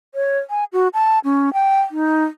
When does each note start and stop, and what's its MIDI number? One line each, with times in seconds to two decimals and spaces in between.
0.15 0.39 73
0.50 0.64 80
0.73 0.88 66
0.94 1.19 81
1.24 1.53 61
1.53 1.80 79
1.91 2.24 63